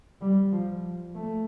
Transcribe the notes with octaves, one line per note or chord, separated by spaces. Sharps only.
G3
F3
A3